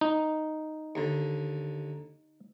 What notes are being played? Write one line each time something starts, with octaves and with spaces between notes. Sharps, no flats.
D#4
D#2 D3